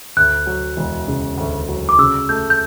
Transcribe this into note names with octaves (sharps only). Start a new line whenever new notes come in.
D2 F#6
F#3
E1
C#3
D2
F#3
D6
C#3 E6
A3 G6
G6